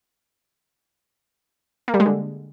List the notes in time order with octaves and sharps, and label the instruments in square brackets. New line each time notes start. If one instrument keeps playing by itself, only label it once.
[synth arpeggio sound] A#3
G3
G#3
D3